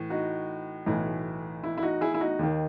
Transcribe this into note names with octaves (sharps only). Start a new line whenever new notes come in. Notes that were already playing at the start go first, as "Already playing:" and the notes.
Already playing: A2 E3
D#4 F#4
B1 A2 E3
E4
E4
D#4 F#4
E4 G#4
E4
D#4 F#4
D#2 D#3